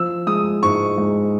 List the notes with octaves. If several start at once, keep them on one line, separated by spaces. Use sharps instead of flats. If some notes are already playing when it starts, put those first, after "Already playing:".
Already playing: F3 E6
G#3 D#6
G#2 C#6
G#3